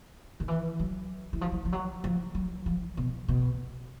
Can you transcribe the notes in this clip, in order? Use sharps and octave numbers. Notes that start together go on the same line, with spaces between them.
D#3
E3
F#3
E3
F3
F#3
F3
F#3
F3
F#3
F3
B2
B2